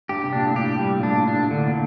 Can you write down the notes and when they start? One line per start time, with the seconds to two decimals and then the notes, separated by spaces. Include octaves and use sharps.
0.09 G2 G4
0.24 C3
0.33 A#2 D4
0.46 A2
0.56 G2 G4
0.80 G3
0.98 A#2
1.03 A2 D4
1.28 D4
1.35 A2
1.51 D3
1.67 A#2